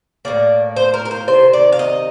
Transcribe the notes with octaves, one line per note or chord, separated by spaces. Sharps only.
A2 G3 A#3 D5
C5
A#4
A#4
C5
C3 D#3 C5
D5
F5
D#5